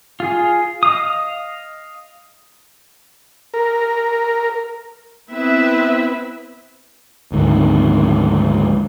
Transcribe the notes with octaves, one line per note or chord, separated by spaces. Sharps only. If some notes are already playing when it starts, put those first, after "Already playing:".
F4 G#4
D#5 F5 D#6
A#4
B3 C4 E4 B4 E5
D2 G#2 D#3